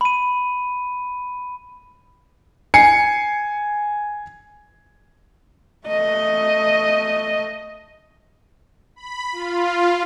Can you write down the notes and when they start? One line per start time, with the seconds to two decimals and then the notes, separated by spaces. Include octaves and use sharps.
0.01 B5 D#7
2.74 G#5 C7 C#7
5.87 A3 D#5
8.96 B5
9.32 F4